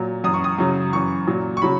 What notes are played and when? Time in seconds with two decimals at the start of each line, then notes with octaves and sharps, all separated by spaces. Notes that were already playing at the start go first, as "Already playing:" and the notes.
Already playing: A#2 F#3
0.24 F#2 E3 D#6
0.34 C#6
0.44 D#6
0.59 F#2 C#3 F#3
0.93 F#2 E3 C#6
1.27 A#2 F#3
1.57 C#6
1.62 C#3 F#3 B5